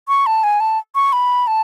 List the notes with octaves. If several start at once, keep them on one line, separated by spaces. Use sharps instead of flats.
C#6
A5
G#5
A5
C#6
B5
A5